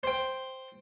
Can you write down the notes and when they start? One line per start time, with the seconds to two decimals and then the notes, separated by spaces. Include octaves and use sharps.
0.03 C5 G5